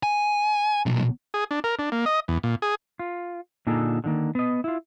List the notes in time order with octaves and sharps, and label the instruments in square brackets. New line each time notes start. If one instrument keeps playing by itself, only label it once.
[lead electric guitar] G#5
B1 A#2
[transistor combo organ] G#4
D4
A#4
D4
A#3
D#5
E2
A#2
G#4
[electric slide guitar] F4
A#2 D3 A#3 D#4 G#4 A4
D3 D#3 A#3
B3 D#5
E4 F4